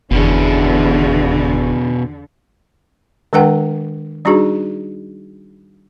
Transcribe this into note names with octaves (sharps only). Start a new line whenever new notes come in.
F#1 E2 B2 D3 C#4
D#3 G#3 D4 B4 F#5 G5
G3 D4 D#4 F#4 G#4